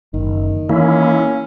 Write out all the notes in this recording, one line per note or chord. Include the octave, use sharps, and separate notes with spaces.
F#1 D#3
E3 A#3 C#4 E4